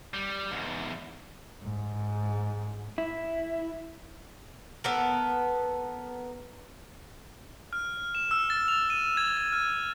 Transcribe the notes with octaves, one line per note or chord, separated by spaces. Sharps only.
G3
E2 G#2
G#2
E4
B3 A4 A#4
F6
E7
E6
A6
F7
D#7
G#6
G#6
F6